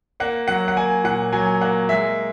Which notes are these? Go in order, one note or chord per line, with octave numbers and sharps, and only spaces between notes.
A#3 F#5
F#3 F#5
F#5
A#3 G#5
A#2 F#5
F#3 G#5
A#3 F#5
G#3 E5